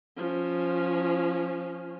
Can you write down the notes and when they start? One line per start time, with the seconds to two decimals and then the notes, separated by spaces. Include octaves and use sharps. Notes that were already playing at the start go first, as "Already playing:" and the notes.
0.17 F3 C#4